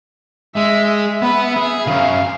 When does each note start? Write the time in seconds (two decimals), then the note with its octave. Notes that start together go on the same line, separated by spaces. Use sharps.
0.56 G#3 E5
0.88 E5
1.22 B3 B4
1.56 G#4
1.86 C#2 F#2 C#4 F5